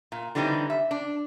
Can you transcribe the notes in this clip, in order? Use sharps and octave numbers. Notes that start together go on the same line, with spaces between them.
A#2
D3 E3 G3 C4 D#4
E5
D4